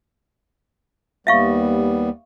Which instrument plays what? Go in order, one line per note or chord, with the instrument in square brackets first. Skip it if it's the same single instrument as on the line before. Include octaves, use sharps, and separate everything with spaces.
[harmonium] D#2 G3 B3 [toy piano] E5 F5 C#6